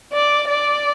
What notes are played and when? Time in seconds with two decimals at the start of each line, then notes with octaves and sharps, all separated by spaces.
0.13 D5
0.48 D5